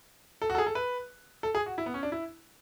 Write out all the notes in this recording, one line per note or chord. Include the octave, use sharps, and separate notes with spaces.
A4
F#4
A4
G#4
A4
B4
A4
G#4
F#4
E4
B3
C#4
D4
E4